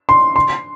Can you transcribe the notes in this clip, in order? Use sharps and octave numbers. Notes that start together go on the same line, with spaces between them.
C6
C6